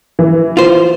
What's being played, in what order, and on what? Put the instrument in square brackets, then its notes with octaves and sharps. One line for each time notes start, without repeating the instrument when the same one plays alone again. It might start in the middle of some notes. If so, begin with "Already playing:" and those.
[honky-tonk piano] E3
[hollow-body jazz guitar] F4 C5